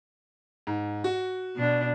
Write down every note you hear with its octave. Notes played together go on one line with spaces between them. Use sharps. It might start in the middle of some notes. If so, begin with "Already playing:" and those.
G#2
F#4
B2 D4